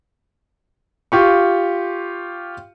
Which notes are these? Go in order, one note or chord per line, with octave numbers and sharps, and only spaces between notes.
F4 G4 C#6